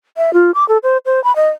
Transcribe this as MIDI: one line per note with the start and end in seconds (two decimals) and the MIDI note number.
0.17 0.33 76
0.33 0.51 65
0.55 0.67 86
0.69 0.78 69
0.83 0.97 72
1.06 1.22 72
1.24 1.35 83
1.36 1.49 75